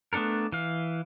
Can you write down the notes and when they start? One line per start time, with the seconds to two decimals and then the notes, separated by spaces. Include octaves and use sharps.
0.13 A3 B3 D4 A4 A#4
0.52 E3 F5